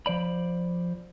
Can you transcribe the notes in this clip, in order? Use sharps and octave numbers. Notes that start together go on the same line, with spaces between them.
F3 C5 D5 B5